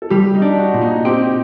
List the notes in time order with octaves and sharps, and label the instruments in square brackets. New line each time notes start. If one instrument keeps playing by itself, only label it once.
[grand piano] A4
[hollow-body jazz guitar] G3 [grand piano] G4
[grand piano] D#4
[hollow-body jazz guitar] D4
[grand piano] F#4
[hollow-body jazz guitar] A#2
[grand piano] D#4
[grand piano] C4 [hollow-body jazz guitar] G4